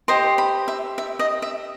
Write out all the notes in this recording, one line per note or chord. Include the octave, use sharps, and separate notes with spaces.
G4 C5 D#5 C6
B5
E5
E5
D#5
E5